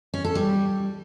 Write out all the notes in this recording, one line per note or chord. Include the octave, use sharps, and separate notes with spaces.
C#4
A4
G3